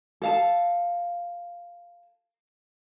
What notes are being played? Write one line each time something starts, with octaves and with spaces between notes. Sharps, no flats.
A4 F5 A5